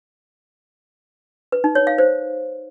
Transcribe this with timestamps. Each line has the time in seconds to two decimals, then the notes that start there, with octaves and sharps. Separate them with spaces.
1.52 B4
1.64 D#4
1.75 C#5
1.87 F5
1.98 C5